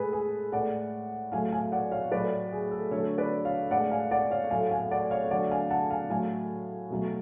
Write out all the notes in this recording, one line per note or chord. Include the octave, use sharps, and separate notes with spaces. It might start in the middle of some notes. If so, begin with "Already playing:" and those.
Already playing: A2 G#3 G#4 A4 B4
G#4
A2 G#3 D5 F#5
A2 F#3 A3 F5 G#5
F5 G#5
D5 F#5
C#5 F5
A2 F#3 A3 B4 D5
G#4
A4
D3 F#3 A3 A4 C#5
B4 D5
C#5 F5
A2 G#3 D5 F#5
F5 G#5
D5 F#5
C#5 F5
A2 F#3 A3 F5 G#5
F5 G#5
D5 F#5
C#5 F5
D3 F#3 A3 D5 F#5
F5 G#5
F#5 A5
F5 G#5
A2 F#3 A3 F5 G#5
B2 F#3 A3